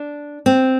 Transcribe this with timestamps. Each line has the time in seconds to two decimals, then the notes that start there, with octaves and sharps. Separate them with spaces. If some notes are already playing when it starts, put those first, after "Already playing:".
Already playing: D4
0.46 C4